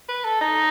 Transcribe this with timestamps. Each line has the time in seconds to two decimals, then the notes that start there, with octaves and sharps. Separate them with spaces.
0.09 B4
0.24 A4
0.41 D#4